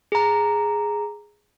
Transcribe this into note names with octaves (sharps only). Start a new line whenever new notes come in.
G#4 A#5